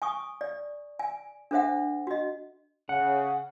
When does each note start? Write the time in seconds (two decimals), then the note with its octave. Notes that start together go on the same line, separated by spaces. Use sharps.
0.02 G#5 C#6 D#6
0.41 D5
0.99 G#5
1.51 D4 A4 C5 E5 F#5
2.07 F#4 D#5
2.89 C#3 F#5